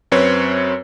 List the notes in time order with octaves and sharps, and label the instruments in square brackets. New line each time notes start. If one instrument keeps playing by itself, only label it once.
[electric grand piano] F#2 C4 B4 C#5